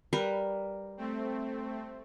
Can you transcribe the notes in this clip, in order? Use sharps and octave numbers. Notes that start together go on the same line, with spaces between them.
G3 A#4 B4
A3 C4